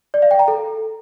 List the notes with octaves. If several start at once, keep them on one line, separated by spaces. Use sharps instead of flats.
D5
F5
G5
A#5
A4